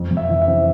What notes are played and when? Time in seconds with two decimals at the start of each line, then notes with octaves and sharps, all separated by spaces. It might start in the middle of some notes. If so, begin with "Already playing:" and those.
Already playing: F2
0.11 F2
0.17 E5
0.29 E3
0.42 E5
0.47 C3